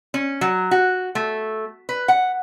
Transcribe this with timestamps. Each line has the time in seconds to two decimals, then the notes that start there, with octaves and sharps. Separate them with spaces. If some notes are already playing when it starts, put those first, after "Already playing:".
0.14 C#4
0.41 F#3
0.71 F#4
1.15 A3
1.89 B4
2.08 F#5